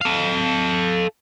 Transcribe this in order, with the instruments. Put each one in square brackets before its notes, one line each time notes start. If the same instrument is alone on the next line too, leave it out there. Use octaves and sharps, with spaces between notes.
[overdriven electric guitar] A4 F5